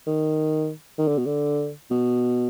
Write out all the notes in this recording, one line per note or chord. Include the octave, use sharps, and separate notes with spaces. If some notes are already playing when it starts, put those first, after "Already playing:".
D#3
D#3
D3
B2
D3
B2